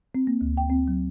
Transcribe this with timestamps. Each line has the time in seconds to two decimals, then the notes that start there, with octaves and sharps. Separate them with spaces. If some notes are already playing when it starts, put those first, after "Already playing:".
0.15 C4
0.27 A#3
0.41 D2
0.57 G5
0.70 C4
0.88 F#3